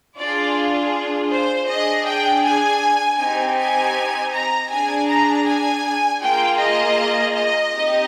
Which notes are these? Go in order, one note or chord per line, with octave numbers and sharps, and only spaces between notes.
D4 F4 G#4 D5
C5
D4 G#4 D#5
G5
G#5
C4 D#4 G4 G#5
G#5
A#5
D4 G#4 G#5
A#5
G#5
A#3 F4 G#4 G5
D#5
D#5
C4 D#4 G4